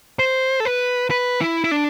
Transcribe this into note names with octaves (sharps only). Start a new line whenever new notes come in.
C5
A4
B4
B4
E4
E4
D4